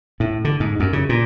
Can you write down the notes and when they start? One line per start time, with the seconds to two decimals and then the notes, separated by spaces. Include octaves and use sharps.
0.20 A2
0.45 D3
0.60 G#2
0.80 F#2
0.93 C#3
1.09 A#2